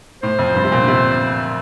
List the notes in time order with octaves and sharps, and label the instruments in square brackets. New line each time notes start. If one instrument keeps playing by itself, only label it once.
[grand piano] A2 [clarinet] C5
[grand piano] F2
G2
C3
A#2
D3
C3